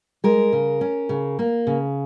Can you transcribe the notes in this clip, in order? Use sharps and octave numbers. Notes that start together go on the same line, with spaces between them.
G#3 A#4
C#3
C#4
C#3
A#3
C#3